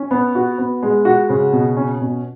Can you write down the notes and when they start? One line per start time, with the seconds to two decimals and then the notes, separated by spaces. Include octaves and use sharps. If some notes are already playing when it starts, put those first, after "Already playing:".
Already playing: C#4
0.11 B3
0.35 F#4
0.58 B3
0.82 G#3
1.05 F#4
1.29 C#3
1.53 B2
1.77 C#4
2.01 B2